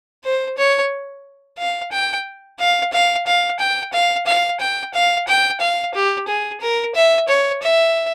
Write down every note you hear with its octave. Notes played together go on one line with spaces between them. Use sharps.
C5
C#5
F5
G5
F5
F5
F5
G5
F5
F5
G5
F5
G5
F5
G4
G#4
A#4
E5
C#5
E5